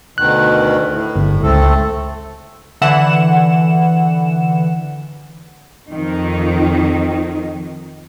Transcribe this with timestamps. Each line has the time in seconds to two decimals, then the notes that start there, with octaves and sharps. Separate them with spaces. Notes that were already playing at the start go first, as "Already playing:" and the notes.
0.18 D2 B2 D#3 F#6
0.93 A2
1.16 G1
1.43 C#2 A3 C4 A4
2.81 D3 E3 F#5 E7
5.91 F2 D#3